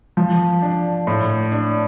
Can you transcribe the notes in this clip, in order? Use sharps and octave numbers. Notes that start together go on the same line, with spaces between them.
F3
D4
A2
D4